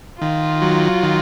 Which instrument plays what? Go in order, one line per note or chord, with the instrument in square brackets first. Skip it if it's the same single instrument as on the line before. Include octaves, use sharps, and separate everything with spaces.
[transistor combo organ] D#3 [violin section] F4
[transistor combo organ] F#3
D#3